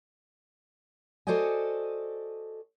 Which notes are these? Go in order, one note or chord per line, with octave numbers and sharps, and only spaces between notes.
F#4 A4 C5 D5 D#5 G#5